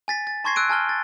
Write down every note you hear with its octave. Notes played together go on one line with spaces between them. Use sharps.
G#5 A6 B6
A6
A5 C6 C#6 G#6 A#6 C7
E6 F#6 D7 D#7
G#5 A5 F6 G7
A6